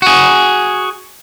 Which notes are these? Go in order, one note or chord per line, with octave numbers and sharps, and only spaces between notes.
F#4 G#4